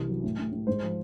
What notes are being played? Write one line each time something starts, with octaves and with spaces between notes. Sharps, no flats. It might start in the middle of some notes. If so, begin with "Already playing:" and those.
Already playing: C2 E3
F#3
A2
A2
A2
G#2 C5
F3